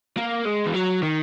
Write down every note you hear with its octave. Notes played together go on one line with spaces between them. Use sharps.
A#3
G#3
E3
F#3
D#3